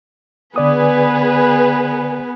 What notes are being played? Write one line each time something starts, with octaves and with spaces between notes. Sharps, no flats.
D3 B3 G#4 B4 D5 D#6